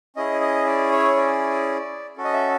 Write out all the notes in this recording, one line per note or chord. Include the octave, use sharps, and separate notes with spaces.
C#4 E4 G#4 D#5
D#5
D5
C#5
D5
C#4 F#4 A4
D#5
E5